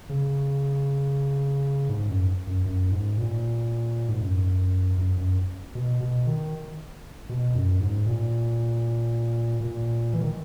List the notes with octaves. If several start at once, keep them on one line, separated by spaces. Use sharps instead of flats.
C#3
G#2
F#2
F#2
F#2
G#2
A#2
G#2
F#2
F#2
F#2
B2
B2
D#3
B2
F#2
G#2
A#2
A#2
E3
D#3